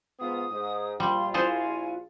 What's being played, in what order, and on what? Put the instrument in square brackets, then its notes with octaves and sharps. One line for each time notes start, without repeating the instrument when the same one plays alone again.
[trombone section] G#2 B3 F4 [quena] D#6
[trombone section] G#2
[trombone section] A#1 F4 [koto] G3 [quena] C6
[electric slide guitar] E4 F#4 F5 [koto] G#4 A4 C5 [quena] G#5